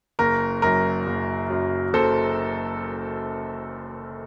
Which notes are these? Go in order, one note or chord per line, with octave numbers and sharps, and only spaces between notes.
F#1 A#4
F#2 F#3 A#4
F#1
F#2 F#3
F#1 A4 C5